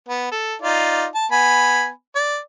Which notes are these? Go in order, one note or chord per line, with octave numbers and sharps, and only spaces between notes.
B3
A4
D#4 F4 D5
A5
B3 G#5 B5
D5